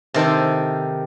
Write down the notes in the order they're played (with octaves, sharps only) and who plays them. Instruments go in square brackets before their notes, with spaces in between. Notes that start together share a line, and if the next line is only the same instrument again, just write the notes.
[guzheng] C3 D#3 A4 C5